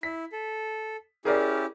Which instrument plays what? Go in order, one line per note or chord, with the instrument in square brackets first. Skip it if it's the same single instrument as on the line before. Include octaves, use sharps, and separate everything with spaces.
[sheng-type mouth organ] E4 [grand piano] B6
[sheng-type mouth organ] A4
[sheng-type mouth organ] C#4 E4 G4 [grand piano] G#4 A#4 D5